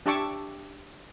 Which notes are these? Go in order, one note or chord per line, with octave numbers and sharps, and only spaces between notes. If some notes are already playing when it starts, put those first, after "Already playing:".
D4 G4 E5 A5 C#6 D6